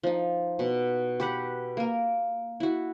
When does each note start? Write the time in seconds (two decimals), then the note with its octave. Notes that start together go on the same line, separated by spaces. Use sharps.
0.03 F3 D#4
0.59 B2
1.20 G4 B4 F#5
1.77 A#3 A#4
2.60 E4 F#4